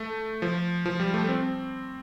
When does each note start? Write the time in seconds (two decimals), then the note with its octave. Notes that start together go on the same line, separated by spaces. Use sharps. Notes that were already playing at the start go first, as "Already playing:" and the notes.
Already playing: A3
0.42 F3
0.86 F3
1.00 G3
1.14 A3
1.29 C4